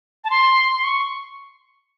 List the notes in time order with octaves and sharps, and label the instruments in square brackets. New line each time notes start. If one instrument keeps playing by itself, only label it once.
[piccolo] A5
C6
C6
C#6